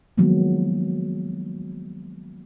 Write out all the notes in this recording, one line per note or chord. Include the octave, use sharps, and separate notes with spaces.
D#3 F3 F#3 G#3 A#3 B3